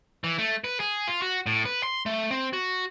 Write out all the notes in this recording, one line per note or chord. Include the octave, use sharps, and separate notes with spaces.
E3
A3
B4
G#4
F4
F#4
A2
B4
C6
A3
C4
F#4